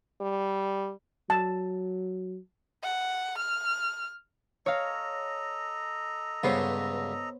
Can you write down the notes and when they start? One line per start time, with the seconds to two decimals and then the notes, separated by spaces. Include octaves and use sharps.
0.21 G3
1.30 F#3 A5
2.83 F#5
3.39 F6
4.66 A4 C#5 D#5 F5 A#5
6.43 C#2 G2 D3 B3 C5 C#5